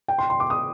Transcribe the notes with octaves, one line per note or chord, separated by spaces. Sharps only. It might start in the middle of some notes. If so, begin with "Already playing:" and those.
G5
C6
C6
D6
D#6